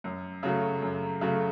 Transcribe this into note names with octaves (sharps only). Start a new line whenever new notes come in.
F#2
C#3 F#3 A3
F#2
C#3 F#3 A3